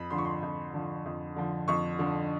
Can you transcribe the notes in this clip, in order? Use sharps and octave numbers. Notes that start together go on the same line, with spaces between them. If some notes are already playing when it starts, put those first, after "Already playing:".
Already playing: F2 B5
D3 F3 C6
C#6
C6
F2
D3 F3
F2
D3 F3
F2 C#6
D3 F3